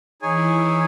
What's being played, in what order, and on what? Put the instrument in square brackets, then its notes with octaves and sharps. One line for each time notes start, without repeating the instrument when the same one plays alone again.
[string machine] E3 E4 [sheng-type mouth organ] D#4 G#4 C#5 G#5